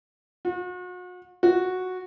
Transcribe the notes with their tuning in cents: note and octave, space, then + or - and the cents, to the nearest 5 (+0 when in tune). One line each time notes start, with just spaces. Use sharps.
F#4 -40
F#4 -5